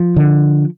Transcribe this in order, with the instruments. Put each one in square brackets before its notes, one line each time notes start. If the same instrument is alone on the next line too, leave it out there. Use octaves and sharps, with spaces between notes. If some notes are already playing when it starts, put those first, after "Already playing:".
Already playing: [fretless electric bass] F3
D3